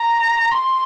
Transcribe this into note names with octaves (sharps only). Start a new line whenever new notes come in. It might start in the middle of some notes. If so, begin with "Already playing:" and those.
Already playing: A#5
C6